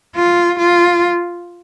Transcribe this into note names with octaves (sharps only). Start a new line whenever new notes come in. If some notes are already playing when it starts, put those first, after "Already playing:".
F4
F4